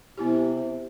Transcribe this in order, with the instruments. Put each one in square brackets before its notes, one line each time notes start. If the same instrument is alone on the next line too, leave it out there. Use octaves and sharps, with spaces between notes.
[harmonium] C3 [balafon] B3 E4 G4